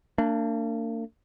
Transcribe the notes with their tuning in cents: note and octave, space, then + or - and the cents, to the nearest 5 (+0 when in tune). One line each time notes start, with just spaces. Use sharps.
A#3 -40 D4 -5